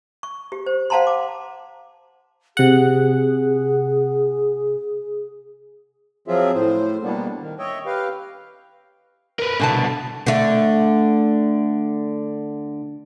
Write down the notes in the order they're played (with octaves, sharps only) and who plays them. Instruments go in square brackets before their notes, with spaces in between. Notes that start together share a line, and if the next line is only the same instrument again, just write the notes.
[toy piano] C#6
G4
C5
C5 F5 F#5 A5 A#5 C6
D6
[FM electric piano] C3 F#5 [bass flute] G#4
[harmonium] F3 F#3 C4 F4 G#4 E5
A2 C5
B2 G3 A#3 B3 D4
D#3
C#5 D#5 E5 G5
G4 B4 F5 G5
[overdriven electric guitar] A#4 B4
[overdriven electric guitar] C2 B2 [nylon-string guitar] D3 G#5 A5
[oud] D3 A3